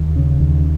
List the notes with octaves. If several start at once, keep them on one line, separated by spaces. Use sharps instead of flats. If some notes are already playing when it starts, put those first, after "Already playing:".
Already playing: D#2
C#3
D#2